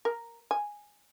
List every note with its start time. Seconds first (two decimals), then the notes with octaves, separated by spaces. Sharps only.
0.05 A#4
0.51 G#5